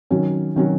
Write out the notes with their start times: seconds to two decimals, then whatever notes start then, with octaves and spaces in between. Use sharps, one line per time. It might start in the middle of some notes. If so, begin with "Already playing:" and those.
0.11 D#3 F#3 C#4 F#4
0.56 D#3 F#3 C#4 F#4